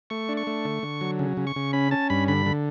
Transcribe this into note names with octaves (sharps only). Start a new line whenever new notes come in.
A3 C#6
D4
C#6
A3
D3
D3
F#3
C#3
C#3
C#6
C#3
C#4 B5
C#4 A5
G2 B5
D3 B5
D3